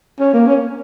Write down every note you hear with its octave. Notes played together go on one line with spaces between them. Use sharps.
C#4
A#3
C#4